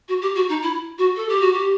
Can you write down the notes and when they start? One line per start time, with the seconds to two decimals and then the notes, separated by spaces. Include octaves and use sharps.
0.08 F#4
0.21 G4
0.35 F#4
0.48 D#4
0.62 E4
0.98 F#4
1.16 A4
1.28 G4
1.40 F#4
1.52 G4